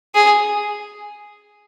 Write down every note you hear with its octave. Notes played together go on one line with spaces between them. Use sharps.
G#4